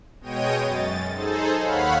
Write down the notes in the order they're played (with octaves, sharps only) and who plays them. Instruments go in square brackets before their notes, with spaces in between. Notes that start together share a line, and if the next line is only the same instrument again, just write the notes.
[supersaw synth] B2 G#3 C#5 D#5 G5 D#7
F#2 A6
D#4 G#4 A4 C5
D#2 C#5 F5 F#5 B5